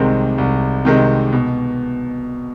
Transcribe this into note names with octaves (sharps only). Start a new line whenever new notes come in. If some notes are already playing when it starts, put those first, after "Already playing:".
Already playing: C2 C3 D#3 G#3 C4
C2
C3 D#3 G#3 C4
B2